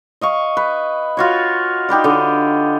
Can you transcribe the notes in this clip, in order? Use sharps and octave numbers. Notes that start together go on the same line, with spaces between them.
D#5 F5 C#6
B4
F4 F#4 C#5
D#4 G4 B4 D5
D3 D#5